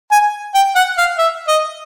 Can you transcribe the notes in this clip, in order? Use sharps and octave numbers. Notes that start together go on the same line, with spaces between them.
G#5
G5
F#5
F5
E5
D#5